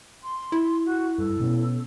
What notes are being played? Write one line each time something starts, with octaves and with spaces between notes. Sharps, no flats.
C6
E4
F#4
G2 A4
B2 B3 C#4